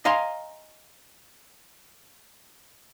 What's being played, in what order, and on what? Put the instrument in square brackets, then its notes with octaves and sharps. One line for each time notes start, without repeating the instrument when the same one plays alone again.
[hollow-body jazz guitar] D#5 F5 G#5 A#5 C6